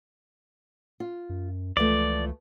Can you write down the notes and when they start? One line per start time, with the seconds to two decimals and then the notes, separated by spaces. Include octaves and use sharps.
1.00 F4
1.29 F#2
1.77 C#2 E3 F3 A3 D5